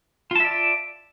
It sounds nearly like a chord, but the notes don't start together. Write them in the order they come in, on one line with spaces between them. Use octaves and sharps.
F4 A5 E5 D5